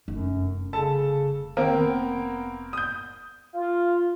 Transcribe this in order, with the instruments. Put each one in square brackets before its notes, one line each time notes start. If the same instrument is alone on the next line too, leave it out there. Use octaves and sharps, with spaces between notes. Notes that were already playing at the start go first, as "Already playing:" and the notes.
[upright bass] F1 G3 [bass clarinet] F#2
[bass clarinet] C#3 [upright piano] A4 A5
[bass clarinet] D#3 [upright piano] A#3 C4 A#4
[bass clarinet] B3
[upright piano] D#6 G6
[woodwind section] F4